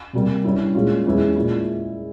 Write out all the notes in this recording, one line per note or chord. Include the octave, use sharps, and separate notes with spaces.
C3 G3 A#3
G2 G3 C#4 E4
A#2 G#3 C#4 F4
E2 E3 G#3 C#4 E4
A#2 G#3 E4